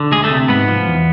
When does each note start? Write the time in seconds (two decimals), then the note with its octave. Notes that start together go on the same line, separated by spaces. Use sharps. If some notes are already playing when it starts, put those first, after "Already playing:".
Already playing: D3
0.12 D2 G#3 G#4
0.24 A3 A4
0.30 C3
0.48 G#2 B3 B4
0.68 F3
0.87 E2